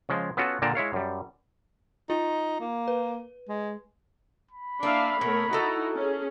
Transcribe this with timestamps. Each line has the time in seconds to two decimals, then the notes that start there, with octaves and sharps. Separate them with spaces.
0.09 C#3 F3 G#3
0.37 B3 C#4 F4 F#4 A4
0.62 A#2 D3 A#3 G5 A5 A#5
0.75 G#3 E4 C#5 F5
0.93 F#2 G3
2.10 D#4 F4
2.61 A#3
2.88 B4
3.49 G#3
4.51 B5
4.83 A#3 D4 E4 E5 F5
5.21 B2 A3 A#4 C#5
5.53 D#4 E4 F#4 A4 A#5
5.96 C#4 G#4